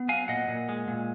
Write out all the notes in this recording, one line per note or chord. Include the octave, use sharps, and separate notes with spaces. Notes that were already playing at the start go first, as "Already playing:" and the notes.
Already playing: B3
F#3 F5 G#5
A#2 D#5 F#5
A#2
G#3
A#2